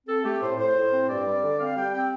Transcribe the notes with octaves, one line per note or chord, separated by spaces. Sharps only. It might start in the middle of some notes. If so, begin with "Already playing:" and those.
C4 A4
A3 G4
A2 C5
A2 C5
A2
C4
G2 D5
G3
D3
C4 F5
G3 G5
C4 G5